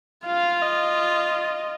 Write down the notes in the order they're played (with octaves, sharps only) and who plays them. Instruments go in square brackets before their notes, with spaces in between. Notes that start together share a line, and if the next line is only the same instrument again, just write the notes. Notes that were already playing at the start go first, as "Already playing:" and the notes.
[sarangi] F4 [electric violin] F5
[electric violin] D#5